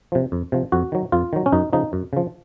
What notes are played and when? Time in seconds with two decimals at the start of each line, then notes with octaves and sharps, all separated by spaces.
0.12 C3 F3
0.32 F2
0.52 C3 F3
0.72 F2 F#4
0.92 D#3 F#3
1.12 F2 F4
1.33 D#3 F#3
1.46 C#4
1.52 F#2 D#4
1.73 C#3 F3 D#4
1.93 F#2
2.13 C#3 F3